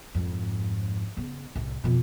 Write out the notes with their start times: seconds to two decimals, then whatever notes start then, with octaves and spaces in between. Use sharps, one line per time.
0.15 F2 G#2
1.17 C#3 B3
1.56 C2 A2
1.84 F2 B2